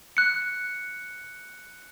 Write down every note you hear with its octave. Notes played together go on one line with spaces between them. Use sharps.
F#6 C#7